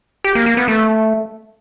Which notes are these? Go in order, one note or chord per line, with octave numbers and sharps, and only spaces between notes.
G4
A#3
A#3
B3
A3